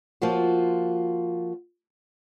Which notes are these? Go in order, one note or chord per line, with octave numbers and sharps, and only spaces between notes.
F3 A#3 F4 F#4